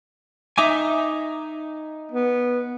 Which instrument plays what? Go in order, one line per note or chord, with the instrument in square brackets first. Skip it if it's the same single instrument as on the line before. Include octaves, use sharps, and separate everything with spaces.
[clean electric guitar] D#4 G#5 [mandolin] E5 A#5 D6
[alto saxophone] B3